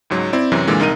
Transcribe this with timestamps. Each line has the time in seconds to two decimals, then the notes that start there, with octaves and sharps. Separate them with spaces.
0.10 C#2 G#2 F#3
0.33 C4 E4 D5
0.52 F#2 C3 E3 F#3
0.67 A#2 D3 E3 G#3
0.80 C2 D#4 A#4 D#7